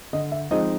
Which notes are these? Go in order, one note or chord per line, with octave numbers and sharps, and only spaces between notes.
D3 D#5
E5
F3 G#3 C4 D#4 D#5